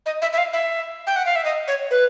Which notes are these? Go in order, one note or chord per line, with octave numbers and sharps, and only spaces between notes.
D#5
E5
E5
F5
E5
G5
F#5
F5
E5
D#5
C#5
B4